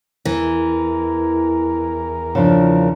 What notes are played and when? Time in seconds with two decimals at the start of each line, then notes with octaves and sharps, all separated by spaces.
0.25 E2 E3 A#4
2.35 C#3 F3 D4